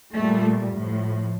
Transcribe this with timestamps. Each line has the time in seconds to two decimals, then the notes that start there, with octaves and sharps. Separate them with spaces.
0.13 A#2 G3 A3
0.73 A2 F3